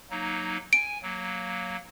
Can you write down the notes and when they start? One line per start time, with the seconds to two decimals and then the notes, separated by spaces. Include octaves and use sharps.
0.11 F#3 A#3 D#4
0.73 G#5 D7
1.03 F#3 A#3